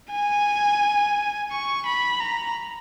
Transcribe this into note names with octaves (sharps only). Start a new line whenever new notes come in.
G#5
C#6
B5
A#5